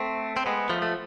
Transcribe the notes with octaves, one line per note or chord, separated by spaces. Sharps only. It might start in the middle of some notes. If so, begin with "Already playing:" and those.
Already playing: A3 C4
C4
G#3 B3
F3 A3
A3